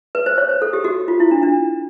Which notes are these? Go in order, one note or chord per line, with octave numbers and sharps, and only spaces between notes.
B4
C5
C#5
C5
A4
G4
F#4
F4
E4
D4
D4